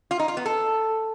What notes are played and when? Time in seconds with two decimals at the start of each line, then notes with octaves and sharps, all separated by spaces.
0.11 F4
0.19 D#4
0.28 F4
0.37 B3
0.46 A4